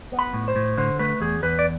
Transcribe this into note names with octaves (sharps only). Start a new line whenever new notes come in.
B3
B5
A2
C5
A2
D3 C5
A3 B4
E2 G#4
E2 B4
D5